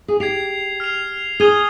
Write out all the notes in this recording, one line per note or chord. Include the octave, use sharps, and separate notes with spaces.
G#4
G4 G#6 C7 F7
F6 C7 F7
G#4 D#6 G#6 D#7 G7